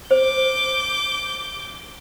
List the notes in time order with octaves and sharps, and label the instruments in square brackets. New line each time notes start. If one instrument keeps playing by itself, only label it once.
[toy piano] C5 [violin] D6 G6